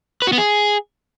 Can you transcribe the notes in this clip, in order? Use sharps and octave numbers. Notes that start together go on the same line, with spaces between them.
B4
F#4
B3
G#4